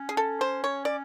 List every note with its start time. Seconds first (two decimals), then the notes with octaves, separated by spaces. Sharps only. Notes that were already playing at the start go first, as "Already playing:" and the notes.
Already playing: C#4
0.09 G#4
0.17 A4
0.41 C5
0.64 C#5
0.85 D5